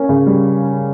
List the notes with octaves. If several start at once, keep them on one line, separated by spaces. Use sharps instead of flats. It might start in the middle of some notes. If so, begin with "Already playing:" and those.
Already playing: A#3 C#4
C#3
G3